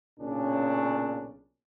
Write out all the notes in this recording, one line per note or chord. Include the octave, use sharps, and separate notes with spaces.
B1 A#2 C#3 C#4 D4